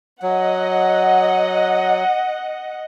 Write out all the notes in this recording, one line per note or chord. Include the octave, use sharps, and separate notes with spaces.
F#3 D#5 F#5